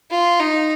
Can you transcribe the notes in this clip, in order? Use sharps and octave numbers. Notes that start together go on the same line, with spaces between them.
F4
D#4